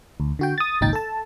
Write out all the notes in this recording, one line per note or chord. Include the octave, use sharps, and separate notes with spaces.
D2
D3 F#4 G5
D#6 A6
G#1 C#2 A#2 D#4 G5 A6
A4 A5